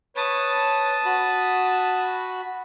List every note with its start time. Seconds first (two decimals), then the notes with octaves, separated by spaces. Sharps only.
0.16 B4 C#5 A5 D#6
1.05 F#4 B5